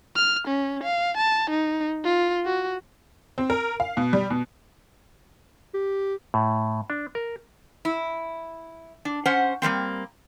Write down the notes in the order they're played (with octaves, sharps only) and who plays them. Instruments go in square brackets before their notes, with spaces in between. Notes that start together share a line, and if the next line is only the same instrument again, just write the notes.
[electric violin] F6
C#4
F5
A5
D#4
F4
F#4
[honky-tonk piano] C4
A#4
F5
B2
G3
B2
[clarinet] G4
[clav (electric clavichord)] A2
D4
A#4
[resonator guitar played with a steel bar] E4
D4
C#4 C5 F#5
G3 G#3 A#3 C4